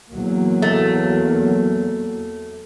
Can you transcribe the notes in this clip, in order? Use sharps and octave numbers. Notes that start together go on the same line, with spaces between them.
E2 F#3 A#3
A3